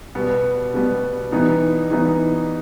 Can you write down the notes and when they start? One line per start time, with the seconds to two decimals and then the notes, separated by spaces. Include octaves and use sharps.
0.15 B2 G3 B3
0.74 B2 G3 B3
1.32 E3 G3 B3 D#4
1.91 E3 G3 B3 D#4